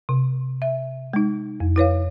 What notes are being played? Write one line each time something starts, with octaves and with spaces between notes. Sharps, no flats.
C3
E5
G#3 D#4
F2
E4 B4 C#5 F5